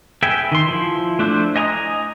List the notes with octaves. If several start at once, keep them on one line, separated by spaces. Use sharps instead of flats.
G#4 B4 E5 G5 G#5
D#3 C6
F3 E4
A3 D4 E4 C5
D#5 G#5 A#5 C6 D#6